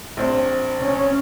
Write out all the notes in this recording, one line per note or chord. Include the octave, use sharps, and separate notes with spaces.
A#1 C4
C#4